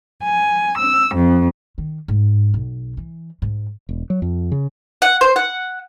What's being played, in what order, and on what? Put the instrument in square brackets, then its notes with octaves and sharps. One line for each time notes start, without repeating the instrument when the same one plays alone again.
[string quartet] G#5
E6
F2
[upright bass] D#3
G#2
B1
E3
G#2
[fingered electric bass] E1
F#3
F2
C#3
[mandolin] F#5
C5
F#5